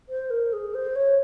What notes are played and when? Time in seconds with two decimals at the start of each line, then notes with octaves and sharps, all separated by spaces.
0.09 C5
0.30 A#4
0.52 G#4
0.74 C5
0.95 C#5